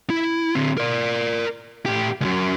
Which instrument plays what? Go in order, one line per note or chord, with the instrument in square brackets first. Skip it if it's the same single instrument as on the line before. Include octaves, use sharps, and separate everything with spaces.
[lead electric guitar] E4
D3 C4
A#4 D5
A2 G4
C#2 F#2